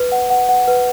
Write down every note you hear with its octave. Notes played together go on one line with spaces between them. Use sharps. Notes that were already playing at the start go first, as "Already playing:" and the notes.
Already playing: B4
F#5
F#5
F#5
B4